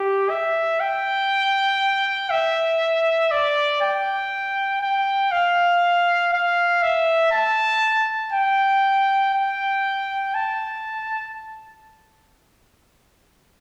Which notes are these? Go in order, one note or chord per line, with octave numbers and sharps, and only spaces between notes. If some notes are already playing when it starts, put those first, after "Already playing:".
Already playing: G4
E5
G5
E5
D5
G5
G5
F5
F5
E5
A5
G5
G5
A5